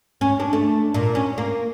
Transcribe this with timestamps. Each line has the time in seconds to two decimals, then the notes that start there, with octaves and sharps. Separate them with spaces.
0.21 C#4
0.40 D4
0.53 A3
0.94 A#2
1.15 C#4
1.38 A#3